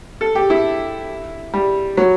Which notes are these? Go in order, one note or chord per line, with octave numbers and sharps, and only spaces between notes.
A4
G4
E4
G3
F#3